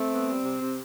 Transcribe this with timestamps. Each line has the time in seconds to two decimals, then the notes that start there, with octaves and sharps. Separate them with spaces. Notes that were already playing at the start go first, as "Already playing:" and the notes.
Already playing: A3 C4
0.11 B3
0.27 G3
0.43 C3
0.60 C3